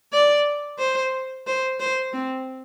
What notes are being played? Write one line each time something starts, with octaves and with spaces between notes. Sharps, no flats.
D5
C5
C5
C5
C4